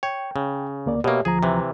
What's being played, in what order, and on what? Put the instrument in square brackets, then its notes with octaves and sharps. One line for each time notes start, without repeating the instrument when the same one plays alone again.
[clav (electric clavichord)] C#5 [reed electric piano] G5
[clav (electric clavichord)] C#3
[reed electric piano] D2 A#3 D5
[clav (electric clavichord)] B2 A#3 [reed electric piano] G4 C#5 E5
[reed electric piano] D2 F3 A#5 [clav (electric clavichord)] G#4
[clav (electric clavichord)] C3 E3